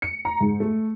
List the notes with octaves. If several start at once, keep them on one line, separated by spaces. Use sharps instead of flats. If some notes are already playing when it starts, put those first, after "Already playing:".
C#7
A#5
G#2
A3